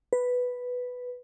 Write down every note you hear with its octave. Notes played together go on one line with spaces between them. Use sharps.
B4